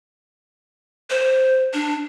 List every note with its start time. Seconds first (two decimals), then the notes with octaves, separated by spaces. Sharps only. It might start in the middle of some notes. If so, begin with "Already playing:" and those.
1.10 C5
1.73 D4